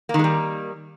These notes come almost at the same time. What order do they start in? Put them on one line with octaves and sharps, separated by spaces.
A#3 D#3 G#3 G3